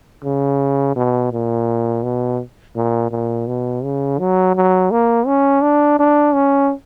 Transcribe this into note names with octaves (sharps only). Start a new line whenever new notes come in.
C#3
B2
A#2
B2
A#2
A#2
B2
C#3
F#3
F#3
A#3
C#4
D4
D4
C#4